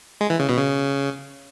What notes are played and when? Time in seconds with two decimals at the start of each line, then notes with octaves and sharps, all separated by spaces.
0.21 G#3
0.30 E3
0.39 C#3
0.49 B2
0.58 C#3